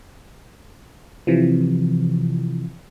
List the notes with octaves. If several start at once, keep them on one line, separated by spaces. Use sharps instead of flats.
C3 E3 F3